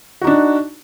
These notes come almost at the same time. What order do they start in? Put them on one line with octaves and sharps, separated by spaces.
F#4 D#4 D4